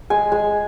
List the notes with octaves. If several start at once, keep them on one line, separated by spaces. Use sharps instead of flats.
G#3 G#5
G#3